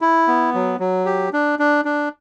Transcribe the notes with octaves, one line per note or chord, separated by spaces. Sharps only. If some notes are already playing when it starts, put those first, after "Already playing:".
E4
B3
F#3
F#3
G4
D4
D4
D4